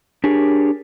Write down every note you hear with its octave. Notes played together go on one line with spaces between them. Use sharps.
D4 G4 G#4 A#4 C#5